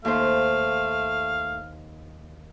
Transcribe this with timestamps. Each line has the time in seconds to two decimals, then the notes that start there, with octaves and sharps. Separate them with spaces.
0.05 D#2 A3 C5 F5